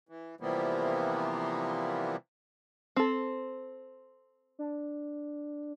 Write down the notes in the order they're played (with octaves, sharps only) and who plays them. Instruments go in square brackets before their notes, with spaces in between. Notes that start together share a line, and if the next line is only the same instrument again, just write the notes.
[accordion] E3
C3 E3 F3 G3 A#3 B3
[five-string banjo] C4 A4
[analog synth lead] D4